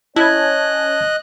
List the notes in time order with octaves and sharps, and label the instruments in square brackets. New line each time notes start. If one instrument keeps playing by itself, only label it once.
[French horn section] C#4 C#5 [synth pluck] E4 [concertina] D#5 F#6 [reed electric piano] A5 G#6